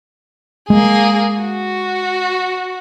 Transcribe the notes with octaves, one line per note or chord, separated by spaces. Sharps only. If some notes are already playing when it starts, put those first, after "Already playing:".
G#3 A#3 G#4
F#4